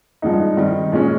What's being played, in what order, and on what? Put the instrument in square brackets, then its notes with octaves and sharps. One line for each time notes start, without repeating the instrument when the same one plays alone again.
[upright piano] G2 F3 G#3 D#4
D#3 G3 C4 D#4
A#2 G#3 C#4